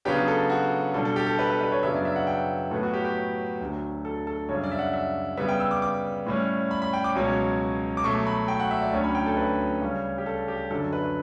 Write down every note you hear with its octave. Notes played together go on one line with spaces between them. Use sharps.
C#3 F#3 B3 D4 G4
A4
F#4
B2 G3 D4 A4
A4
G4
A4
B4
A4
B4
C#5
F#2 C#3 F#3 B3 D4 E5
D5
E5
F#5
G5
A2 F#3 B3 A4
F#4
G4
G4
D2 D3 F#3
A4
A4
F#2 C#3 G3 D4 C#5
D5
E5
F#5
E5
C#3 G3 B3 E5
G5
E6
D6
D6
A2 G3 C#4
B5
B5
G5
D6
C#2 B2 F#3 C#4
D6
B2 F#3 A3 C#6
B5
G5
F#5
E5
D5
D2 D3 F#3 C#4 C#5
B5
G5
A4
B4
C#3 G3 C#4
G4
A4
G4
F#2 D3 F#3 A4
B4